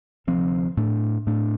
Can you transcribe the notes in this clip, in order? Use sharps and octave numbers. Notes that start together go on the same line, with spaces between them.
D2 C3 F3 C4
A2 A3 D4
A2 A3 D4